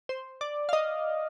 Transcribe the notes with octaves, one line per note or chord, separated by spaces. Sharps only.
C5
D5
F5
D#5